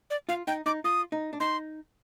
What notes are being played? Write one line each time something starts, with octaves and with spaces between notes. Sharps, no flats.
D5
F4 F5
D#4 G5
D#4 D6
F4 D#6
D#4
D4
D#4 C6